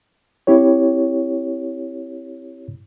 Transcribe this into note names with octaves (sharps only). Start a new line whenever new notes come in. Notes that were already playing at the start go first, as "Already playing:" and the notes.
C4 E4 G4 C#5